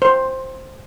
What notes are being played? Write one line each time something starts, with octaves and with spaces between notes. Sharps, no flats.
C5